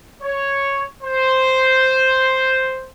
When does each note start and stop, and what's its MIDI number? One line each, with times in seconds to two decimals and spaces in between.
0.22 0.83 73
1.03 2.87 72